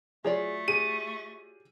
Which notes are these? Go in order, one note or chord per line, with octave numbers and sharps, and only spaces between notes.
F#3 A3 F4 G#4 D5
G4 G#4 D#7